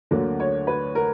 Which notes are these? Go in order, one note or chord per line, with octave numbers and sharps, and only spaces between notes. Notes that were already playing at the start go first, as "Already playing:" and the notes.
D2 D3 F#3 A#3
C#5
B4
A#4